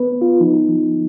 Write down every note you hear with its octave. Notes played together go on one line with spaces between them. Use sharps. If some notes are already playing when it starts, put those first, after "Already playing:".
Already playing: B3 B4
B3
F4
F3 D#4
F3